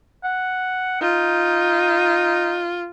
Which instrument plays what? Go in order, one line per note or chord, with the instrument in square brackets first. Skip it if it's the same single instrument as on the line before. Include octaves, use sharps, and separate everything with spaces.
[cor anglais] F#5
[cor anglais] D#4 [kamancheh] F4